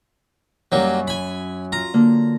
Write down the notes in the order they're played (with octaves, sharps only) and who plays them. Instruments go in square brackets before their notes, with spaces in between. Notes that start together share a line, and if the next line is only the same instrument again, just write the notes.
[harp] F#2 C#4 [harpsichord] F#3 G3 A#3
[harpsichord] G#5 B5
[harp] F4 [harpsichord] A#5
[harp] D3 A#3